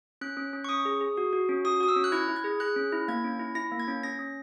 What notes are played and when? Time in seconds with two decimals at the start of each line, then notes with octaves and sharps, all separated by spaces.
0.21 C#4 F#6
0.37 C#4
0.53 C#4
0.64 C#6
0.69 C#4 D#6
0.85 G#4
1.01 G#4
1.17 F#4
1.33 F#4
1.49 C#4
1.65 F#4 D#6
1.80 F#4 D#6
1.88 E6
1.96 C#4
2.04 F#6
2.12 E4 G#6
2.28 E4
2.36 G#6
2.44 G#4
2.60 G#4 F#6
2.76 C#4
2.92 E4
3.08 A#3 G#6
3.24 C#4
3.40 E4
3.55 E4 A#6
3.72 A#3
3.80 G#6
3.88 C#4
4.03 C#4 A#6
4.19 C#4